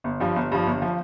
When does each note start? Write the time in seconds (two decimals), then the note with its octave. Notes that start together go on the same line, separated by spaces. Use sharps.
0.04 G1
0.20 G2 F3
0.36 G1
0.52 G2 F3
0.67 G1
0.82 F3